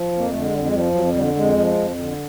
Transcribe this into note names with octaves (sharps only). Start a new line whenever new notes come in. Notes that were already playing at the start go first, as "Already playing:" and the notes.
Already playing: F3
F2
A#3
D3 A3
G#3
F2 G3
G#3
F3 G3
F2 F#3
D3 G3
F2 G#3
F3
F2
D3